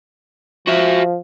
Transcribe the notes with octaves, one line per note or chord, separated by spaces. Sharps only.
F3 F#4 E5